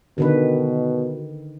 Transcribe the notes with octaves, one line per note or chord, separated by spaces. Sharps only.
B2 D3 D#3 B4